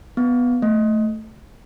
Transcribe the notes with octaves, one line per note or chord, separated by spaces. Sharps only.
B3
A3